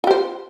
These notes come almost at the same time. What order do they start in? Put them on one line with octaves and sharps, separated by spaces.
F4 G4 C5